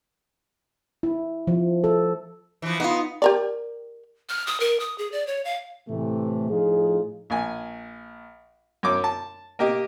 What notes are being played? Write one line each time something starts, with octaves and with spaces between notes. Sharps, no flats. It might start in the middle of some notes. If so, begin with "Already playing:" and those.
E4
F3
A4
E3 F3
B3 D#4 F4
G4 A#4 D5
F6
D#6
A#4
D#6
G#4
D5
C#5
F5
A2 C3 E3 A3
A2 F3 D#4 F4 G#4
A#1 G#5
F#2 C#5 D6
A5
A#3 G4 D#5